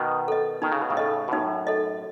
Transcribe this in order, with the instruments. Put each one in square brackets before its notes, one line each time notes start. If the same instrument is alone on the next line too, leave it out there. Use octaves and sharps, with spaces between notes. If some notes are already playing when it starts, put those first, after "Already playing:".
Already playing: [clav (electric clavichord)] B2 D#3
[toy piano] A4 D#5
[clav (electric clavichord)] D#3 [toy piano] D#4
[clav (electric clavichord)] C#3
B2
A2 C#3
[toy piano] A4 D#5
[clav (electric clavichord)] B2
[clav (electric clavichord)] F#2 A2 [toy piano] D#4
[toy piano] A4 D#5